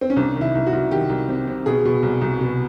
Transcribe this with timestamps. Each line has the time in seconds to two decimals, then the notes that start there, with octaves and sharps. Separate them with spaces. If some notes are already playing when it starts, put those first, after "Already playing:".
0.01 C4
0.10 C#4
0.16 C2 D4
0.36 D#3
0.41 E4
0.55 C2
0.66 F#4
0.73 C2
0.91 D#3 G4
1.10 C2
1.29 C3
1.47 C3
1.66 B2 G#4
1.85 B2
2.03 C2
2.21 C2
2.41 B2